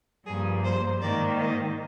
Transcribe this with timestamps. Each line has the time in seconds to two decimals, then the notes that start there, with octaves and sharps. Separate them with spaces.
0.25 G2 F3 A#3 G#4
0.63 C5
1.00 G#2 D#3 A#3 D5
1.39 D#5